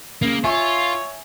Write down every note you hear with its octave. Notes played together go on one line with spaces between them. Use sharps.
C#3 A#3
F4 C#5 E5 G#5 C#6